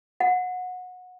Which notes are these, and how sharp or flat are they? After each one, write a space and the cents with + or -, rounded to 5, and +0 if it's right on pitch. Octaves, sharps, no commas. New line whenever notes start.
F#5 -20